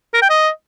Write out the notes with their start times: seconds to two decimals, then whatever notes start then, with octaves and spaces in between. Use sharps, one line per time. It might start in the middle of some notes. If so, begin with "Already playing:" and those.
0.14 A#4
0.22 G5
0.30 D#5